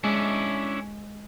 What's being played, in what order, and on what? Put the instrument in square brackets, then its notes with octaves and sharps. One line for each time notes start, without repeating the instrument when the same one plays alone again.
[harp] G#3 [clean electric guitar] C#4 D4 E4